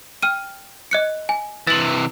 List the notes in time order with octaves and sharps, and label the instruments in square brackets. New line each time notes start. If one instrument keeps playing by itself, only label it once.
[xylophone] G5 F6 D#7
D#5 F#6 C#7
G#5
[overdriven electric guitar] C3 E3 [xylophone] A6 F#7